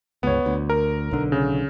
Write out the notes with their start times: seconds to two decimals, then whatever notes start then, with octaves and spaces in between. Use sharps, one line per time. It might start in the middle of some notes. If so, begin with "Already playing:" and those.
0.23 G1 C#2 B3 C#5
0.46 D2
0.70 A#4
1.11 B1 D3
1.32 C#3